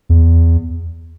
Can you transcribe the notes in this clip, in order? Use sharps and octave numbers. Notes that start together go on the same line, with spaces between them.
E2